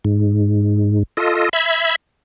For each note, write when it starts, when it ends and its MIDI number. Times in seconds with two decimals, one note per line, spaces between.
0.05 1.03 44
1.17 1.49 65
1.17 1.49 69
1.17 1.49 75
1.53 1.96 76
1.53 1.96 83
1.53 1.96 92